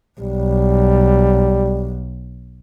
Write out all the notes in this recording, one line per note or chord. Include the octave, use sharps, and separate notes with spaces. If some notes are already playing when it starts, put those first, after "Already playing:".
B1 G3